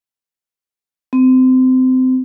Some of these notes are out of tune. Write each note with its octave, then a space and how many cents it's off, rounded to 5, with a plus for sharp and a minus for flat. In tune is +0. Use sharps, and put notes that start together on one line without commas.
C4 -25